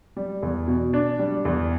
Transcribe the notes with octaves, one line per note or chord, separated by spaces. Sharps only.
G3
E2
B2
D4
G3
E2